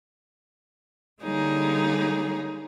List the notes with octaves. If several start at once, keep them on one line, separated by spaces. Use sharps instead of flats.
D3 G3 A#3 D#4 G#4 C#5